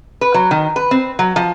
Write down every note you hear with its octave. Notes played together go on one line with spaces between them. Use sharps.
B4
F#3
D#3
B4
C4
F#3
F3